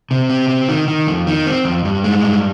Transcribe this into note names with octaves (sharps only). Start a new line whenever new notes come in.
C3
C4
C4
D#3
D#3
F2
D#3
C4
F2
G2
G#3
G2